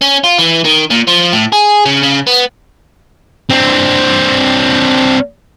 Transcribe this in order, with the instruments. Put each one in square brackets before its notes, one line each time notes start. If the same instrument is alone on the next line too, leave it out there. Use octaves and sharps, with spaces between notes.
[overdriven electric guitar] C#4
F4
E3
D#3
A#2
F3
A2
G#4
C#3
C#3
B3
[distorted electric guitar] C4 D4